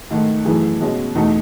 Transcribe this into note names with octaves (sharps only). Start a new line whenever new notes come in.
G#2 D#3 A3
F#2 E3 A3 E4 G#4
B2 G#3 C#4 F#4
E2 B2 A3 D#4